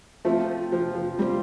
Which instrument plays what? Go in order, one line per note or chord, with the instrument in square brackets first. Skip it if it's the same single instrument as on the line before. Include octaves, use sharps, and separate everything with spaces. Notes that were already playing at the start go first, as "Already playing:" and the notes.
[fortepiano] F3 A3 [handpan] C4 F4 C5
[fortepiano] F3
F3
[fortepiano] G3 [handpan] C4 F4 C5